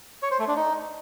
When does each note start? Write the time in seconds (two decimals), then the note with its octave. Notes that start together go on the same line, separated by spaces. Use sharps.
0.23 C#5
0.31 C5
0.39 A3
0.48 D4
0.56 D#4